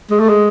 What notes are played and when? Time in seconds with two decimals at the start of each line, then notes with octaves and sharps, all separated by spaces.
0.11 G#3
0.20 A3
0.29 G#3